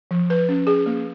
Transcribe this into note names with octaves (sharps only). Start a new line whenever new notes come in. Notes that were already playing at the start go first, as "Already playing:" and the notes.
F3
B4
C#4
G#4
A#3